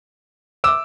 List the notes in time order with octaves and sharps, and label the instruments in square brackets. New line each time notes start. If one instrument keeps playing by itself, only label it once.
[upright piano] D6 E6